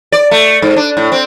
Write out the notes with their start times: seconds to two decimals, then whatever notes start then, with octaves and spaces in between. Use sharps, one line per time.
0.12 D5
0.31 A3
0.62 G#2
0.76 D4
0.97 A2
1.12 C4